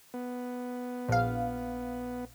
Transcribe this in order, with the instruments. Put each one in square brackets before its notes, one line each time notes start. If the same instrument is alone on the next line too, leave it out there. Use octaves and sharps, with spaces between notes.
[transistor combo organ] B3
[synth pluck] A#1 F5